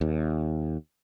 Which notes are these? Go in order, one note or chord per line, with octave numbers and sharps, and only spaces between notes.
D#2